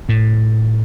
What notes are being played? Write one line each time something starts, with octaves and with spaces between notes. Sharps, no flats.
A2